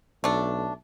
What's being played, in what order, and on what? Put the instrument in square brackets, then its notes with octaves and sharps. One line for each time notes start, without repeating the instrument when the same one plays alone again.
[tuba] B1 [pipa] A3 D4